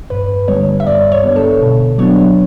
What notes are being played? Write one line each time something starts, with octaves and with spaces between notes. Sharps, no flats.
G2 B4
D3 G3 B3 C#5
E5
G2 D5
C#5
D3 G3 B3
A4
B2
F#3 B3 D4 C#5